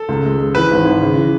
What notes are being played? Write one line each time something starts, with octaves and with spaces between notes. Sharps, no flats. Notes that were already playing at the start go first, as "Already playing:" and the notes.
Already playing: A4
C#2
G#3
G#3
E3 B4
G#1
G#1
C#3
E3